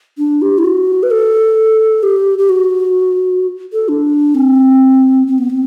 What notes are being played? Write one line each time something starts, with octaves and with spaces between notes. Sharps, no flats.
D4
G4
E4
F#4
B4
A4
G4
G4
F#4
A4
D4
C4
C4
B3
C4